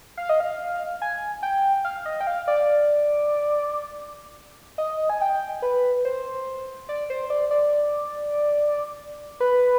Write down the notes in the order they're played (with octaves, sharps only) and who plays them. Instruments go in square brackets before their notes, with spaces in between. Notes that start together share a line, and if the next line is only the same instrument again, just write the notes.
[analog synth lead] F5
D#5
F5
G#5
G5
F5
D#5
G5
F5
D5
D#5
G#5
G5
B4
C5
D5
C5
D5
D5
B4